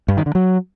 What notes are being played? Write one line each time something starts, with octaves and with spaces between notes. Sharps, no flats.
G2
D#3
D3
F#3